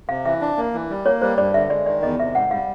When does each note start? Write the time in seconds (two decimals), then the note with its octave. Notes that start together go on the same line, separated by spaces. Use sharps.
0.09 C3 F5
0.25 E3 E5
0.41 D4
0.57 A#3
0.74 E3
0.90 G3
1.05 A#3 C#5
1.22 G3 C5
1.38 G2 D5
1.54 D3 E5
1.70 G#3 D5
1.86 D#3 D5
2.03 E2 D#5
2.20 C3 E5
2.35 G#2 F#5
2.51 G3 F5